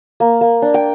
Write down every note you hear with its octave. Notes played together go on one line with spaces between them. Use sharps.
A#3
A#3
D4
G5